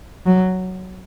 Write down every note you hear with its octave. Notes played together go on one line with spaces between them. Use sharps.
F#3